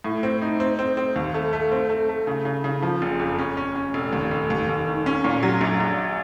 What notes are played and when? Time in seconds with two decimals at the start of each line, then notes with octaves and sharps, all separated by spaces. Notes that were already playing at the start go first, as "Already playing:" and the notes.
0.04 A2
0.23 C4
0.42 D#4
0.60 C4
0.79 C4
0.97 C4
1.16 D#2
1.34 A3
1.53 A3
1.72 C4
1.89 A3
2.09 A3
2.27 C#3
2.45 C#3
2.64 C#3
2.82 F3
3.02 F#1
3.19 F2
3.39 C#4
3.57 C#4
3.75 C#4
3.94 F1
4.13 D#2
4.31 F1
4.50 D#2
4.69 D#2
4.87 D#3
5.06 C#4
5.24 A#2
5.43 F#3
5.61 A#1
5.80 A#1